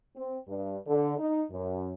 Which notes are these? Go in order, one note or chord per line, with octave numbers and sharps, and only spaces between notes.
C4
G2
D3
D#4
F#2